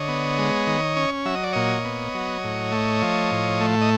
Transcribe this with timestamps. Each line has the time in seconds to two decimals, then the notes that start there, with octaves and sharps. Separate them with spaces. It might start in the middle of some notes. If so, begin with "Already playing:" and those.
Already playing: D3 C#5 D#5
0.08 B3
0.38 G#3
0.67 D#3
0.96 C#4
1.25 F#3 E5
1.35 D#5
1.43 D5
1.52 A#2 C#5 D#5
1.85 B3
2.14 F#3
2.44 A2
2.72 A3
3.02 F3
3.31 A2
3.61 A3
3.81 D#5